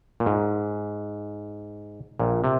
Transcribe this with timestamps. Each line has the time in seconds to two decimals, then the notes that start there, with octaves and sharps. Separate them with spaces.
0.20 A#2
0.26 G#2
2.20 A#1 A#2
2.44 C3